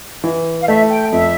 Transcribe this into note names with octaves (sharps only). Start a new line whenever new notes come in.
E3
F5
A3 E5
G5
F2 E5